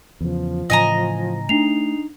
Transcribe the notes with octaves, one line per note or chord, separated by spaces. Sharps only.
E2 C#3 F3
A2 C#3 E3 D#5 G#5 A#5
A3 D4 D#4 C7 F7